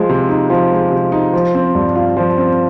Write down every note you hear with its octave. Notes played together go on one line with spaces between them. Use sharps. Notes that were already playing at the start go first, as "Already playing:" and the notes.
Already playing: F3 G#3
C3
D#4
F3
G#3
C3
D#4
F3
C4
G2
F4
F3
C4